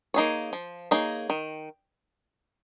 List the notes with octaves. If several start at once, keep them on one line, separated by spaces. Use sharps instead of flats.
A#3 D#4 G#4 C#5
F3
A#3 D#4 G#4 C#5
D#3